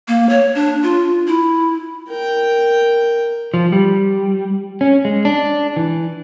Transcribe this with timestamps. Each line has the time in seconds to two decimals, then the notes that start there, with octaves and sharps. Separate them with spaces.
0.08 A#3
0.29 C#5
0.55 D4
0.83 F4
1.27 E4
2.09 A#4 G5
3.54 F3
3.72 G3
4.81 C#4
5.05 G#3
5.25 D4
5.76 E3